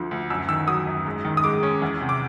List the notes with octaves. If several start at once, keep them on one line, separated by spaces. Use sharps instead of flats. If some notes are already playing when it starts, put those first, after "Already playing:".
Already playing: D2 D3 F3
D2
F#2 E6
D#3 E6
F#3 D#6
F#2
G#2
D#3
D#6
G#3 D6
C#4
E2
C3
D6